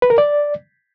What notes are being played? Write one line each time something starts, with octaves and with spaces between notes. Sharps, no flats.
B4
A#4
D5